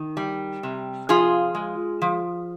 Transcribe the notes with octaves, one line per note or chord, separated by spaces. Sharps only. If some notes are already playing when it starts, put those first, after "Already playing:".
Already playing: D#3
G3
C3
F3 F4 G#4
G#3
F3